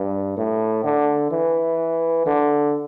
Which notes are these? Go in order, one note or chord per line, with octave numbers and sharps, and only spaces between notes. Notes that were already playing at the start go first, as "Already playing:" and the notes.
Already playing: G2
A2
D3
E3
D3